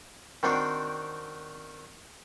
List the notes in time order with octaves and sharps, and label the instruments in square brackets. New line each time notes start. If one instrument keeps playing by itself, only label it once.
[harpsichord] D#3 C4 D4 F#4 D5 C6